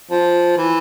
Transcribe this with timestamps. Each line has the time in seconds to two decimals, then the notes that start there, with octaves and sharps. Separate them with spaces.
0.11 F3
0.57 E3